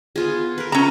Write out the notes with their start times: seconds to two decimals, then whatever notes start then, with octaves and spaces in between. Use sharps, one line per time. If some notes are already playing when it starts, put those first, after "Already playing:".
0.16 B3 F4 G#4
0.58 A#4 B4
0.72 C#4 A#5